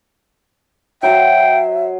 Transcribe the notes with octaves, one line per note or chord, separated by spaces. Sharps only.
F#3 C5 E5 G5